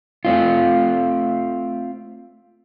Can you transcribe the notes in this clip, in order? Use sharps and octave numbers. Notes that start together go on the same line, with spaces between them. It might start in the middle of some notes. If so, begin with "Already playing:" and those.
A3 C4 F4